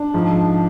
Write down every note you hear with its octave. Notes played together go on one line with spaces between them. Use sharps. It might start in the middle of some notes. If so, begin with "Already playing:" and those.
Already playing: D4
G#2 F3